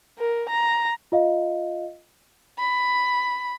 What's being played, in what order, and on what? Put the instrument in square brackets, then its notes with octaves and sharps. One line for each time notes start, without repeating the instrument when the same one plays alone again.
[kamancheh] A#4
A#5
[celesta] F4 D#5 F5
[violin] B5